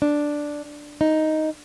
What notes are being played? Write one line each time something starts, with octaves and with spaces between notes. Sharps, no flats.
D4
D#4